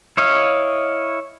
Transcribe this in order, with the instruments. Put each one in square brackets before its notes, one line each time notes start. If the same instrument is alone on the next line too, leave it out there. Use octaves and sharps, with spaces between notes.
[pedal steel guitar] E4 C#5 D#5 F5